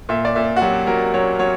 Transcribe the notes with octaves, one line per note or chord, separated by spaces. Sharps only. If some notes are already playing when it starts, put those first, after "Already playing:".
A#2 E5
D5
A#2 E5
F#4
F#3 G4
F#3 A#4
F#3 C#5
F#3 C#5